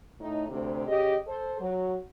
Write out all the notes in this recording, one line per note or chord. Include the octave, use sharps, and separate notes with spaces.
A2 D#4
D2 C3
C#3 G4 D#5
A4 C5
F#3